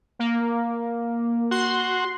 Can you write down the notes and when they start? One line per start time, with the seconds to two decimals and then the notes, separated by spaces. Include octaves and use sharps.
0.19 A#3
1.51 F#4 C6